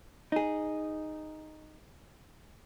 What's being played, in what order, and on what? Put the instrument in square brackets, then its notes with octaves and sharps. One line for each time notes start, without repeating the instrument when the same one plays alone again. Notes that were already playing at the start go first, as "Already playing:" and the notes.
[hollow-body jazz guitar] D#4 G#4